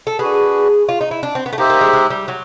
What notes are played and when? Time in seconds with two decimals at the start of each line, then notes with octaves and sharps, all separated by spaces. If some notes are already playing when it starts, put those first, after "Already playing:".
0.07 A4
0.19 D4 F#4 G#4 B4
0.89 F4
1.01 D#4
1.11 E4
1.23 D4
1.35 C4
1.46 B3
1.53 A3
1.58 A#3 D#4 G4 C5 E5
1.70 A#3
1.81 G#3
1.93 G#3
2.10 G3
2.28 F#3